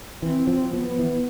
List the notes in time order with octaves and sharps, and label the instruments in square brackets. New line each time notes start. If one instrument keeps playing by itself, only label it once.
[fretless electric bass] E3 [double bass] C4
[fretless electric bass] F3
[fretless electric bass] F3 [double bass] B3
[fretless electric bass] E3